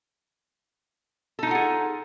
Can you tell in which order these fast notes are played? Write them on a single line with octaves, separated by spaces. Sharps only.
A4 D#4 F4 F#5 G#4